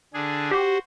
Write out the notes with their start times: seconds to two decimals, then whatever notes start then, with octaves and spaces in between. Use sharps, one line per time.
0.14 D3 D4 G#4
0.51 F#4 G4 C5